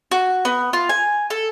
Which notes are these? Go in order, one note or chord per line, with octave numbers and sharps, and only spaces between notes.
F#4
B3
F4
G#5
A4